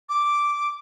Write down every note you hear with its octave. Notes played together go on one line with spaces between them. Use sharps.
D6